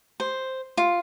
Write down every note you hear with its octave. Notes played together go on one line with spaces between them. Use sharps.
C5
F4